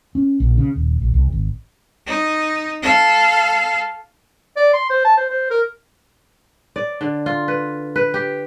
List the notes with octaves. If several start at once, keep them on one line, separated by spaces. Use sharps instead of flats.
C#4
A#1
C#3
D#1
A#1
C2
G#1
D#4
A4 F5
D5
C6
C5
A5
C5
C5
A#4
D5
D3
F4
B4
B4
G4